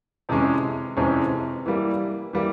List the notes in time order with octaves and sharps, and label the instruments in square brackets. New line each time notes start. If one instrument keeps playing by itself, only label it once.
[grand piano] F2 C3 E3 G#3 C#4
F2 C3 E3 G#3 C#4
E3 G3 A#3
E3 G3 A#3